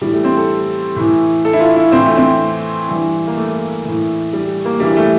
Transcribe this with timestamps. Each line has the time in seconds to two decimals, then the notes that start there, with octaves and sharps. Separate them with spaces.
0.01 A2 E3 G3
0.12 A3
0.24 C4
0.36 A4
0.96 A2 E3
1.45 A4
1.53 E4
1.60 F4
1.76 E4
1.92 A2 E3 C4
2.05 A3
2.17 C4
2.89 G2 E3
3.27 A#3
3.37 A3
3.84 A2 E3
4.33 G3
4.65 A#3
4.80 G2 E3 G3
4.96 A3